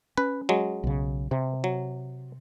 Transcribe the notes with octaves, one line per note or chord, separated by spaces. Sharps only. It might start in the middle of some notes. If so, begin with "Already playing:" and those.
C#4 B4
F#3 G#3
B1 C#3
C3
F#3